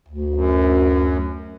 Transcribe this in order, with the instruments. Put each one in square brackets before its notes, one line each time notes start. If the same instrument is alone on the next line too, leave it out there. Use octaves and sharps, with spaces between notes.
[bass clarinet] D2
[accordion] F#2